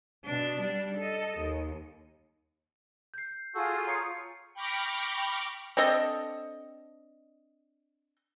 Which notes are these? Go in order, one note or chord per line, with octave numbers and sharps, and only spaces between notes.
B2 D4
G3 D4
A4 D#5
D#2
G6 C7
F4 F#4 G#4 A4
C#5 A#5 C7 C#7
G5 B5 C#6 D6 F6 A#6
C4 D4 A4 D#5